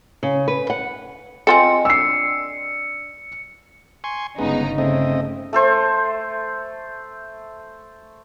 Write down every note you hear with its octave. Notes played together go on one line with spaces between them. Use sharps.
C#3
B4
F#5
C4 F4 A4 D#5 G5 G#5 C#7
D4 E6 C7
G#5 C6 C#6
G1 C#3 G#3 B3 D#4
C#3 A3 C4 D#5
A3 A4 C5 C#6